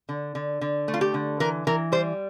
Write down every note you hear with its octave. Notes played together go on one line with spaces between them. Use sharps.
D3
D3
D3
A3
F4
G4
D3
E3 A#4
E3 A#4
G3 C5